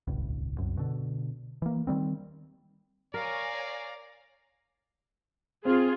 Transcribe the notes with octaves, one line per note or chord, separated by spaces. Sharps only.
D#1 G#1 C#2
C2 F#2
B2 D3
E3 A#3
D#3 E3 G3 C4
A#4 C#5 D5 F5 G#5 A#5
C4 F4 G#4